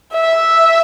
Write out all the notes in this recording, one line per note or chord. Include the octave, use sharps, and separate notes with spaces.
E5